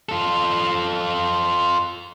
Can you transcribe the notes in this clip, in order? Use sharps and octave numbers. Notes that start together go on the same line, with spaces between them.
F4 A4